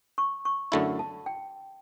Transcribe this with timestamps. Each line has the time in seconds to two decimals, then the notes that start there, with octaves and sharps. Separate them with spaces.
0.18 C#6
0.45 C#6
0.72 F#2 D3 A3 E4 B5
0.99 A5
1.26 G5